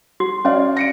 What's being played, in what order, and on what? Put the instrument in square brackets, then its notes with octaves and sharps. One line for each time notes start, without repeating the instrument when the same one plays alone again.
[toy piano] F#4
[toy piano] C#4 [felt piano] C#5 D5 F5
[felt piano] A#6 C#7 D7